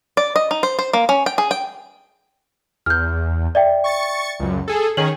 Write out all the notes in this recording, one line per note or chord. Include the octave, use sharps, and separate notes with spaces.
D5
D#5
D#4
C5
C5
A#3
C#4
G5
G#4
G5
E2 F6 G6
D5 E5 G5
C#6 A6 C#7
C#2 F#2
G#4 A4
D#3 C#4 G#4 F#7